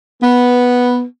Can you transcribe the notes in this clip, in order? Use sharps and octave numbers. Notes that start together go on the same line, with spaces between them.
B3